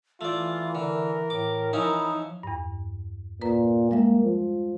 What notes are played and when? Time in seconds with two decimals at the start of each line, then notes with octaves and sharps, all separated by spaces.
0.21 E3 A3 F4 D5
0.75 D3 A#4
1.30 A2 D6
1.73 E3 F3 C#4 D#4 E4
2.43 E2 G2
3.41 A#2 B4 A#5
3.91 G3 G#3 A#3 E5
4.25 F3